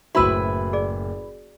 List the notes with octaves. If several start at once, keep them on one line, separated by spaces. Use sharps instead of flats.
F#1 A2 E4 F#4 B4 C5 B5 E6
G#4 D5